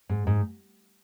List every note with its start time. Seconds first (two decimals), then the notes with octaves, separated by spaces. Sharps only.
0.09 G#2
0.27 G#2